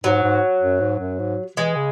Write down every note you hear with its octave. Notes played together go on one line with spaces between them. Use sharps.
G#2 F#3
G#2
F#2
G#2
F#2
G#2
E3 G#3
C#3